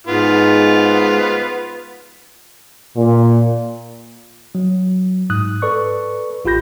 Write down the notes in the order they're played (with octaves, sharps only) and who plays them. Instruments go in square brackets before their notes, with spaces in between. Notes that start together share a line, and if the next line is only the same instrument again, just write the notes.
[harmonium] G#2 [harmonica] B3 F4
[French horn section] A#2
[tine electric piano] F#3
G#2 D#6 F#6
A4 B4 D5 C#6
A1 F4 G4 B5 G6 A#6